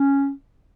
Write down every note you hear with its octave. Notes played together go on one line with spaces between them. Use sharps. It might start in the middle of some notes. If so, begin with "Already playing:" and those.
Already playing: C#4